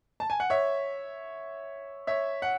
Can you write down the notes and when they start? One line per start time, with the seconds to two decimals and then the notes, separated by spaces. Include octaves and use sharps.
0.20 A5
0.30 G#5
0.40 F#5
0.50 C#5 E5
2.07 C#5 E5
2.42 F#5